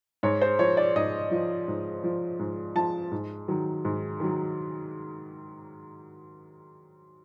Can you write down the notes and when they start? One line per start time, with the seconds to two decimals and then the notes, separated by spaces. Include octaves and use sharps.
0.23 G#2 C#5
0.41 C5
0.59 F3 C#5
0.77 D5
0.96 G#2 D#5
1.31 F3
1.68 G#2
2.04 F3
2.39 G#2
2.75 F3 A5
3.12 G#2
3.48 D#3 F#3
3.85 G#2
4.20 D#3 F#3